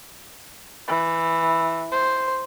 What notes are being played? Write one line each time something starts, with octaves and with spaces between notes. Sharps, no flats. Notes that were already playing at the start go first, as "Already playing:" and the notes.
E3
C5